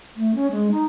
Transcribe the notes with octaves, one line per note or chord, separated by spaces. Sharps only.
A3
C#4
G#3
D#4